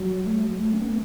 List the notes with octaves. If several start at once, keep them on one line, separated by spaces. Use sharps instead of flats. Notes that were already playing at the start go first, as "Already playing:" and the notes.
Already playing: F#3
A3
F#3
A3
C#4
B3
A3